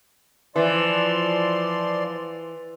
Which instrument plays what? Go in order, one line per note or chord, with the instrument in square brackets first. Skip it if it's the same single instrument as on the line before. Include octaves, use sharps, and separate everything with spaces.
[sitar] E3 [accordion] F3 D5 C6